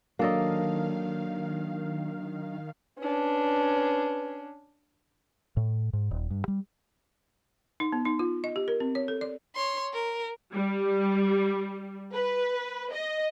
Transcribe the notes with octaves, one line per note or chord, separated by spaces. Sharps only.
D#3 F#3 A#3 D4 A4 D#5 F5
C#4 D4 B4
A2
G#2
D#1
G2
G3
D#4
B3
D#4
F4
D#5
G4
A#4
C4
C#5
A4
D5
C#5 C6
A#4
G3
B4
D#5